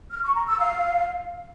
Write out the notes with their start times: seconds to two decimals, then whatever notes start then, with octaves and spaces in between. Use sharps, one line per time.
0.11 F6
0.23 C#6
0.35 A#5
0.47 E6
0.59 F5